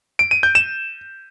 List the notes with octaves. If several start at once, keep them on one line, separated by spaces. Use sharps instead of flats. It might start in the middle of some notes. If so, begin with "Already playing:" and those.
D7
D#7
G6
E7